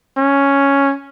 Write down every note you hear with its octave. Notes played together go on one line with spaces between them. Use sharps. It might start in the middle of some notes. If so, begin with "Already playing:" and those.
C#4